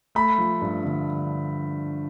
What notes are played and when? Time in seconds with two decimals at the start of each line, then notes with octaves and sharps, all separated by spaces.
0.15 A3 B5
0.38 F3
0.61 G2
0.85 D3